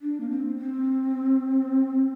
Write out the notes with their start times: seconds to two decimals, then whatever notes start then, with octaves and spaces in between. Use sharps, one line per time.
0.01 D4
0.20 A#3
0.30 C4
0.57 C4